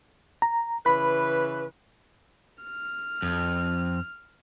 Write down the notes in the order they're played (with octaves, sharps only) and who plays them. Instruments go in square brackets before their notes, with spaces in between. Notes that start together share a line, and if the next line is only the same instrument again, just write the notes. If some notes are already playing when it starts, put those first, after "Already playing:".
[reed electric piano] A#5
[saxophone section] C#3 E3 B4 [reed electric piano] B5
[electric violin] F6
[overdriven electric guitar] F2